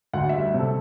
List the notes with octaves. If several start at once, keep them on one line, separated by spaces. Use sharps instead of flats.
D2 F#5
G3 E5
C3 A4